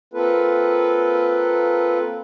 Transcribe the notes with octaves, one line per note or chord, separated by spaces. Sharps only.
A#3 C4 F4 A4 B4